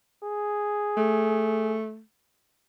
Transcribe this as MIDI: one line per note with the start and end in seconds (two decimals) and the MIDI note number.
0.23 1.76 68
0.97 2.01 57